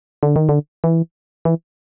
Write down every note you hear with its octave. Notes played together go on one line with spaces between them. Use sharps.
D3
D#3
D3
E3
E3